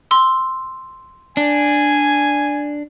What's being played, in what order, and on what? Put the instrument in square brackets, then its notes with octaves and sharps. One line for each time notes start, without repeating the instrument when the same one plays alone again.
[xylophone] C6 E6
[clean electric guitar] D4 [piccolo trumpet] G#5